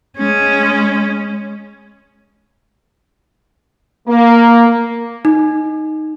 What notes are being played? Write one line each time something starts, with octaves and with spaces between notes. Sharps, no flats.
G#3 C#4
A#3
D#4